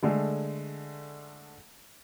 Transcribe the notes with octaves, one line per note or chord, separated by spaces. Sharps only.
D3 G#3 A3